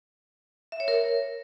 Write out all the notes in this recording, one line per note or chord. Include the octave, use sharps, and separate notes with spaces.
E5
C#5
A#4